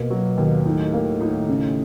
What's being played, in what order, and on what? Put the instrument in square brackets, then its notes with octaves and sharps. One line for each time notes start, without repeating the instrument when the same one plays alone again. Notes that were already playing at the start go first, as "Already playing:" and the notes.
Already playing: [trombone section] B2 [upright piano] A#3
[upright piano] F#3
D#2
[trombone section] A2 [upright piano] D#4
[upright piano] A#3
D#4
C#3